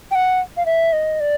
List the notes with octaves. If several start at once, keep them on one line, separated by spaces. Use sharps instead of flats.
G5
F#5
F5
E5
D#5
D5